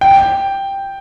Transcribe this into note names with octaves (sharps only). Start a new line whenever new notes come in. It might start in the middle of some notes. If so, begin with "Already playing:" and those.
G5